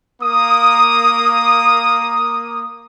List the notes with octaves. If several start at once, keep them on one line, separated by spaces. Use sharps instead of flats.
A#3 D#6